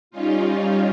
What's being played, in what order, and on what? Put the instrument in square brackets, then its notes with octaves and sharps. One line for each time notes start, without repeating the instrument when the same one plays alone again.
[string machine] G3 C#4 D#4 F4